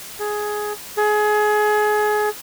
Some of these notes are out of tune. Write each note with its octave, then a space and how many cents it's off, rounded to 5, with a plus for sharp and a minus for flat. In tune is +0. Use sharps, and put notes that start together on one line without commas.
G#4 +10
G#4 +25